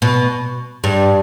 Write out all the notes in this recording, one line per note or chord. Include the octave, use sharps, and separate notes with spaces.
B2
G2